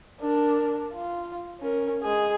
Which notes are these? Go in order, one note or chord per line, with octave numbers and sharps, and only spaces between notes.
D4 A#4
F4
C#4 A#4
G#3 G#4